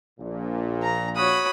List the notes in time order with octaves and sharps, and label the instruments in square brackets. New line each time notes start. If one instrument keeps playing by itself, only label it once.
[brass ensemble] A#1 A#2
[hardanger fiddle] A#5
[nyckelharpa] F#4 C#5 [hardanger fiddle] B5 D#6